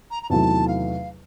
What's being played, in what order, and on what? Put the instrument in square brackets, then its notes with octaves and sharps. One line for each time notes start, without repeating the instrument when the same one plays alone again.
[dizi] A#5
A#5
[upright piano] E2 C3 D#3 F#3 A3 [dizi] A5
[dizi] F5